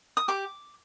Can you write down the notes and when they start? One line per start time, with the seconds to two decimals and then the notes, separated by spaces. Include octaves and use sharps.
0.17 D#6
0.28 G4 D6